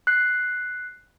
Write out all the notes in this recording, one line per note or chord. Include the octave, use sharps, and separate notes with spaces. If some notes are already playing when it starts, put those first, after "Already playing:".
F#6 C7